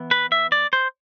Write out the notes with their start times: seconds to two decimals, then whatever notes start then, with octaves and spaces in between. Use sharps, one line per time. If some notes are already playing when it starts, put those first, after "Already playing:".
Already playing: E3 B3
0.11 B4
0.32 E5
0.52 D5
0.73 C5